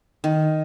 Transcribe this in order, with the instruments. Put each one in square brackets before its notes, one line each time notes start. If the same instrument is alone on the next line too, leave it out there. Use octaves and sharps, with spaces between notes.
[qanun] D#3